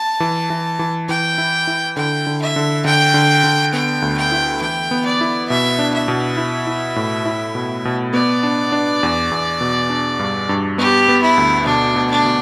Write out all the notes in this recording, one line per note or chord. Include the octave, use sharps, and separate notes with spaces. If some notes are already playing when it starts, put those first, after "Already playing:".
Already playing: A5
E3
E3
E3
E3 G5
E4
E4
D3 G5
D3
E5
D3
D3 G5
D3
D3
B3 G5
D2
G5
E4
E3 G5
B3
D5
E4
B2 E5
D4
E5
B2
E4
E4
A2
E4
B2
B2
B3 D5
D4
D4
E2
E2
B2
D4
G2
G2
B3 G4
B3
E4
D2
B2 D4
B2
D4
B2